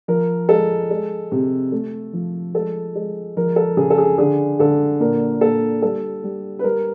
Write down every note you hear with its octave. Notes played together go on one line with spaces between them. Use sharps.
F3 A#4
G#3 A4
G#3
C3
A3
F3
G#3 A4
G#3
F3 A#4
A4
C#3 G#4
A4
G#4
D3 G#4
D3 A4
A#2 A#4
A#2 A4
G3 A4
G3
B4
G3 A#4